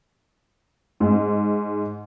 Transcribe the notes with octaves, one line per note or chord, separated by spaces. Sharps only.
G#2